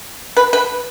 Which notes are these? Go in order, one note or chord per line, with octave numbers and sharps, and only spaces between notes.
B4
B4